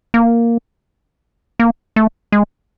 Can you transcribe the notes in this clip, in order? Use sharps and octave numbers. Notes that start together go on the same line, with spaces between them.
A#3
A#3
A3
G#3